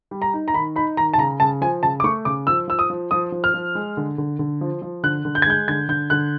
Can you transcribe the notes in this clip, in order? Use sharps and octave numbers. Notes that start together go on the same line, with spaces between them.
G3
A#5
D#4
A#5
D#3 B5
D#4 B5
D#3 A#5
A5
C#3 A#5
C#3 A5
F3 G#5
C#3 A5
D6
A3 C#6
C#3 D6
F3 E6
F3 E6
D#6
F3
F3 D#6
F3
F6
F3
G#3
D3
D3
D3
F3
F3
D3 F#6
D3
G6
G#6
G#3 G6
D3 G#6
D3 G6
D3 F#6